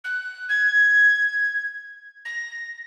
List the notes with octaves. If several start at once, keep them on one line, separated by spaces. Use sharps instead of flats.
F#6
G#6
A#6